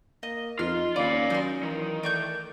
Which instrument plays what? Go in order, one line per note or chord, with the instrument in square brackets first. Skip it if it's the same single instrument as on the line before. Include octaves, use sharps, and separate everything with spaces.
[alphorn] A#3 [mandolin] D#5
[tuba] F2 [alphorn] D#4 [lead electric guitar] F4 [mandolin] F6
[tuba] D#2 [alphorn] C#4 [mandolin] F4 B5 D6 [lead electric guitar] D5 F5
[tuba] F#3 [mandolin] D#4 C6
[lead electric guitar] D#3 [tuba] E3
[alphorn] A3 [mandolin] D5 C#6 G6